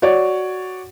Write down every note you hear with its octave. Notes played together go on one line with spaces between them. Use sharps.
F#4 C#5 D5